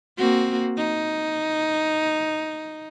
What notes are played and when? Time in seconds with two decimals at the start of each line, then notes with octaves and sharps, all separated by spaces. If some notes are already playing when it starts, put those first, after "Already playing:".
0.18 A#3 C4 F#4
0.77 D#4